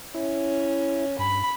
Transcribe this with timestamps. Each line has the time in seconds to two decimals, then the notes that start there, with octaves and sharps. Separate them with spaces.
0.14 C#4 E4
1.19 G2 B5